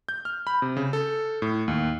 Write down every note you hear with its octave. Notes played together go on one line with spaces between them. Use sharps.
G6
F6
B5
C3
C#3
A4
A2
D#2